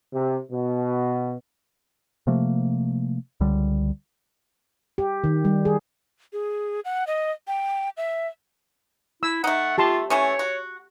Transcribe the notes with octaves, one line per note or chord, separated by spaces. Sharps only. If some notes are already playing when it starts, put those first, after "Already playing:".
C3
B2
C3 F3 A3 A#3
C#2 D3 G3
G4
D#3
G3
G#4
G#4
F#5
D#5
G5
E5
E4 E6
A3 D#4 F#5
F4 G4 A5 C6
E3 A3 C#4 C#5
F#4